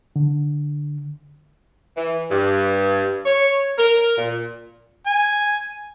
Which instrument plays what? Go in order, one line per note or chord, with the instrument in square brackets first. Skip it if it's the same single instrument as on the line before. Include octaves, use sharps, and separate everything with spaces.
[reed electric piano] D3
[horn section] E3
G2
C#5
A#4
A#2
[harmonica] G#5